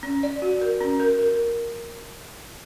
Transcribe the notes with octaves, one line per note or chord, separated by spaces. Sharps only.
C#4
D5
F#4
A#4
C#4
A#4
A#4